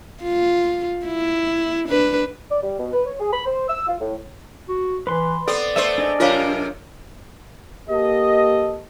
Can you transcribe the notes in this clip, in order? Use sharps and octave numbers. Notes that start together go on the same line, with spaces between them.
F4
E4
D4 B4
D5
G3
B2
B4
C#5
G#4
B5
C5
E6
F4
A2
F#4
E3 B4 C6
B3 C4 A4 D5
A3 B3 C5 E5
D4 G#4 D#5
F#2 C3 F4 A#4 C#5 F5
A#3 G4 A4 D#5